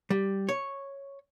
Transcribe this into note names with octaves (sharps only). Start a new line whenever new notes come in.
G3
C#5